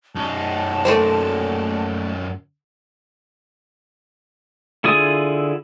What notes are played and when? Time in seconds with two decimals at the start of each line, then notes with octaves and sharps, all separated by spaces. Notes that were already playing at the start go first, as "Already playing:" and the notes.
0.15 F#2 D#4 A5
0.85 A3 A#3 C5
4.84 D3 E4 F4 G#4 D#6